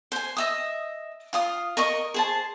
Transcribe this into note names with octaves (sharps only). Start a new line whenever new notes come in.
C5 G#5
D#5 E5 D#6
F4 F5 D#6
A#4 D#5 C#6
G#4 C5 A5